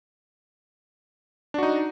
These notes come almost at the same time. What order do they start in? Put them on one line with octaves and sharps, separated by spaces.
D4 F#4 D#4